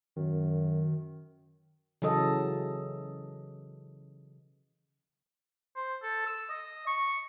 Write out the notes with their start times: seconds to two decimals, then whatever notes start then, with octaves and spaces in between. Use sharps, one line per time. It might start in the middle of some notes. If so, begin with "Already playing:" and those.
0.16 F#2 D#3
2.02 C#3 E3 F#3 A4 D#5
5.76 C5
6.02 A4
6.26 E6
6.49 D#5
6.87 C#6